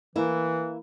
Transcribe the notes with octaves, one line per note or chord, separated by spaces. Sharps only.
E3 A#3 E4